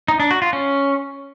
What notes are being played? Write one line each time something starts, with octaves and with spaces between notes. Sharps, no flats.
D#4
D4
F#4
F4
C#4